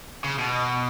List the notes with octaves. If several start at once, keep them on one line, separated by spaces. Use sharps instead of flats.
C#3
B2